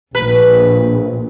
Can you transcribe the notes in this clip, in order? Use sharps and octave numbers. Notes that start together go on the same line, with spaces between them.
A#1 B4